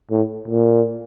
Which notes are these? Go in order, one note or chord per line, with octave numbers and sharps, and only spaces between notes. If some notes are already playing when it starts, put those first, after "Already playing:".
A2
A#2